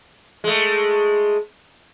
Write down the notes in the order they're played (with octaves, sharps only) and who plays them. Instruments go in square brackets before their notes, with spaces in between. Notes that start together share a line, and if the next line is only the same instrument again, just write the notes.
[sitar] G#3 A3